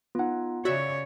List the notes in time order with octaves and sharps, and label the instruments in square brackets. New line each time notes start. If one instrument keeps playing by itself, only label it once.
[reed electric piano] B3 F#5 [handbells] D#4 F4
[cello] C#3 C#5 [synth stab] F#4 E5 [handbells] D5